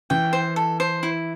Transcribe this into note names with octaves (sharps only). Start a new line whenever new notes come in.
E3 G5
C5
A4
C5
E4